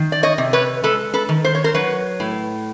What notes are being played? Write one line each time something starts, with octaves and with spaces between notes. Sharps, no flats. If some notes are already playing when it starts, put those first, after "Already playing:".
Already playing: D#3
D5
C#5 D#5
C3
B4 C#5
G#3 A4 B4
A4 B4
D#3
C5
C#5
A#4 C5
F#3 B4 C#5
A2